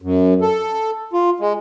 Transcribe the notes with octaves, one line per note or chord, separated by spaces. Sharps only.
F#2
A4
F4
G#3